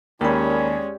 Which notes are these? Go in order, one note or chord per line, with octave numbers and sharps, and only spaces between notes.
D#2 G#3 C#4 G4 A#4 D5 B5 E6